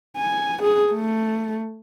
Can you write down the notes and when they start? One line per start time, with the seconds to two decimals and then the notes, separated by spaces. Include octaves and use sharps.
0.17 G#5
0.62 G#4
0.92 A3